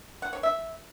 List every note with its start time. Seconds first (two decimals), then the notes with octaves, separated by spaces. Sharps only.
0.22 F#5
0.33 C#5
0.43 E5